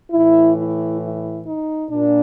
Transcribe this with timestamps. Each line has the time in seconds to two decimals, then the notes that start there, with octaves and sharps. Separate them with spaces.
0.11 A2 E3 E4
0.56 E4
1.00 E4
1.46 D#4
1.90 A#2 D4